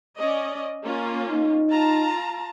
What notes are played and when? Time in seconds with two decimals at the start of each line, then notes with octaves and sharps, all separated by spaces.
0.18 C#4 D5 D#5
0.84 A#3 C#4 F4
1.30 D#4
1.70 F4 A5 A#5